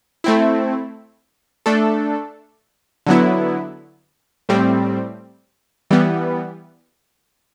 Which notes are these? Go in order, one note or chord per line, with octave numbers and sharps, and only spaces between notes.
A3 C4 E4
A3 D4 A4
D3 F#3 B3 E4
A2 G3 C4
E3 G3 B3